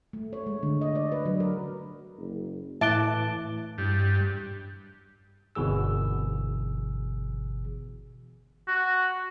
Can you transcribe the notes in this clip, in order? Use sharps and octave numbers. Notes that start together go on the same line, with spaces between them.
A3
C#5
G#3
D3
D#5
D5
B4
F#3
A#4
F#1
A2 E3 E5 A5 D6 F#6 D7 G7
G2
G1 B2 E3 G#4 E6
F#4